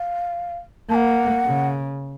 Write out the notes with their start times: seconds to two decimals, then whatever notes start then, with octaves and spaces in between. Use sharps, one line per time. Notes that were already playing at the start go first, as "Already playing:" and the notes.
Already playing: F5
0.90 A#3 F#5 A5
1.45 C#3